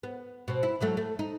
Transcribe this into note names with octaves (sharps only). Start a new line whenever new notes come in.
B3
B2 C4
E4
E3 F#3 A3
A3
D#4